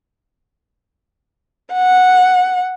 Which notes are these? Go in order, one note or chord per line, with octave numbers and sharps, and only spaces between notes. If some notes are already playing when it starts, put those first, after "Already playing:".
F#5